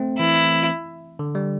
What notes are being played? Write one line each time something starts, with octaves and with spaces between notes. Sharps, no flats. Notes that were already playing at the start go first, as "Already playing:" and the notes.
Already playing: A3 C4
E3 E4
D3
G3